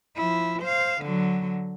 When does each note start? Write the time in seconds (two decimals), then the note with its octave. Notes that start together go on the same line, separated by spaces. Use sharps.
0.16 F3 E4
0.63 C5 F5
1.01 D3 F#3